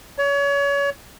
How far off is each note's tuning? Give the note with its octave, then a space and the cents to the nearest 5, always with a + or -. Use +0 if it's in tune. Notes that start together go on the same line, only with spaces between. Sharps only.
C#5 +30